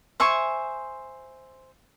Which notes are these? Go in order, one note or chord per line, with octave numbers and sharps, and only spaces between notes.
C5 E5 G#5 C#6